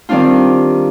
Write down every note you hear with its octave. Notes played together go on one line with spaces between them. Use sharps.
D#3 G3 C4 D4 F4